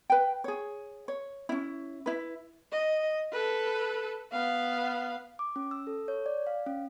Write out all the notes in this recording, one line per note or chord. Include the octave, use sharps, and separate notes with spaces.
B4 G5
G#4 C#5
C#5
C#4 E4
E4 B4
D#5
A4 B4
B3 F5
D6
C#4
E6
A4
C#5
D5
F5
C#4